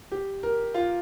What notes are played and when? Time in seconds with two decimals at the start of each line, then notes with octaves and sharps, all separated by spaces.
0.11 G4
0.43 A#4
0.74 F4